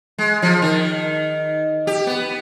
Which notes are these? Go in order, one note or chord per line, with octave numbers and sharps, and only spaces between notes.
G#3
F3
D#3
G4
B3